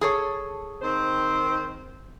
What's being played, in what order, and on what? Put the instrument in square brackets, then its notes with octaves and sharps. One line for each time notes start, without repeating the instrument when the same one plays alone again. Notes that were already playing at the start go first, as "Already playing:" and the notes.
[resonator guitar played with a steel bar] G#4 A4 C#5
[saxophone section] D#3 C4 C5